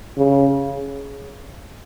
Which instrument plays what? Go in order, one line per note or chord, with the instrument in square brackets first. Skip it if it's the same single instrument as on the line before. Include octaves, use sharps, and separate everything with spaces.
[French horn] C#3